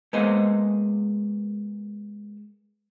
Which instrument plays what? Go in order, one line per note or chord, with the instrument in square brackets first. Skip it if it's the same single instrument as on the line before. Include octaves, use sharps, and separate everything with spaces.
[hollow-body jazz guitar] G#3 A#3 B3 C5 D#5